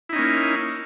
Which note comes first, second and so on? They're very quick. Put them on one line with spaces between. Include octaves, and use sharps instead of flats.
E4 D#4 C#4 A#3